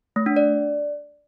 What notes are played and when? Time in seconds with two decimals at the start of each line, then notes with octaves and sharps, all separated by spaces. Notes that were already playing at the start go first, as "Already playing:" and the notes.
0.16 A3
0.26 D4
0.36 D5